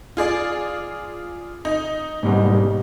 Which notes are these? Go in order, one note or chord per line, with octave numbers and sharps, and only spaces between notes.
F4 G#4 D5
D#4
G#2 B2 G3